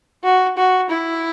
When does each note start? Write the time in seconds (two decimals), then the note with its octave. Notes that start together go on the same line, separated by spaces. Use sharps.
0.24 F#4
0.57 F#4
0.90 E4